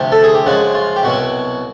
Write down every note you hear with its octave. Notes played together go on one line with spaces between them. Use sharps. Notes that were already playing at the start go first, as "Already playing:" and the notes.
Already playing: D2 C3 F3 G4
A4
G#4
G4
F#2 C#3 F3 G#3 F#4
F4
G4
C2 B2 F#3 F#4